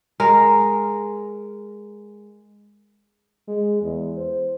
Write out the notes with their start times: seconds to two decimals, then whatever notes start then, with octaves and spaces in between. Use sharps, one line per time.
0.20 G#3 A#4
3.48 G#3
3.82 E2
4.17 C5